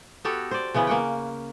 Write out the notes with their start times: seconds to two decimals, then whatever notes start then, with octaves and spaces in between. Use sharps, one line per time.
0.25 B3 F#4 G4 A4
0.51 C5 D5
0.74 C#3 E3 B3 C#4
0.87 A#3 F#5 G5